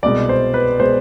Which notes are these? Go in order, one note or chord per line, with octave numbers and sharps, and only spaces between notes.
C2 B2 G#3 D5
C5
B4
B2 G#3 C5